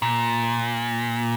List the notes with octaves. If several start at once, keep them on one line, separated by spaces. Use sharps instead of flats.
A#2